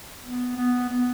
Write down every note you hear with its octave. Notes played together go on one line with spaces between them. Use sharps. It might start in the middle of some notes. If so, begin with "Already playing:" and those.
B3
B3
B3